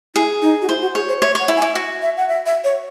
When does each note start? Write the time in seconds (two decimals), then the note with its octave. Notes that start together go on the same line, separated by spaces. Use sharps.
0.15 E4 G#4
0.42 D#4
0.62 F#4
0.69 E4 C5
0.82 F#4
0.95 G#4 C#5
1.08 C5
1.22 C#5 E5
1.35 C#5 F#5
1.48 E4
1.57 G#5
1.62 E4
1.75 F#4
2.02 E5
2.17 F#5
2.29 E5
2.46 E5
2.64 C#5